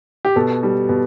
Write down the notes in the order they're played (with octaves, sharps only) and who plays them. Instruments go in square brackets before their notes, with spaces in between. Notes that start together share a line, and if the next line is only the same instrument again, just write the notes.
[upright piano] G4
B2 A4
G3
B2